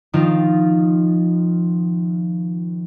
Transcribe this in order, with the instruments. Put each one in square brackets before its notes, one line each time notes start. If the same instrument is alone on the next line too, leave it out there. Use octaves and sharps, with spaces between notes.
[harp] D#3 F3 C4 D#4 F4